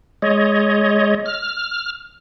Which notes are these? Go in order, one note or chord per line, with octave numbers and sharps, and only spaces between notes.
G#3 C#5 D#5
F6